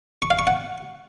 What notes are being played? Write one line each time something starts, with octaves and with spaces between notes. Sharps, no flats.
C#6
F5
C#6
F#5